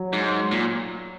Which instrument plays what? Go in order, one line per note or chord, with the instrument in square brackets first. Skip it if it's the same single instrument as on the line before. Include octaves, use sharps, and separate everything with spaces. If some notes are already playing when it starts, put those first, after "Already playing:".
Already playing: [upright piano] F#3
[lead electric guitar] G#2
A#2